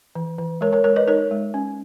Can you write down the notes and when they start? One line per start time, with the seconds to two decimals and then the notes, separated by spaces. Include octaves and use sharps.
0.15 E3
0.38 E3
0.61 G#3 A#4 C#5
0.73 A#4 C#5
0.84 G#3 A#4 C#5
0.96 B4 D#5
1.07 D#4 A#4 C#5
1.31 G#3
1.54 C#4